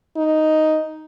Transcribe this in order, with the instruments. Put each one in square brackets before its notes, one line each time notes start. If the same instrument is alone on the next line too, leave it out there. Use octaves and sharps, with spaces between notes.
[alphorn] D#4